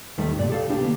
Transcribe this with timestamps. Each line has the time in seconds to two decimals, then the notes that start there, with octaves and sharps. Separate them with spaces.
0.18 D#2 D#3 G3 A3
0.35 C2 G2 A#2 D5
0.50 G4 A4 F5
0.68 C2 A2 D4 G4
0.81 D3 A#3 B3